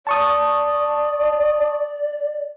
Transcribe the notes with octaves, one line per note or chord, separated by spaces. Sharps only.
D5 A5 C#6 D#6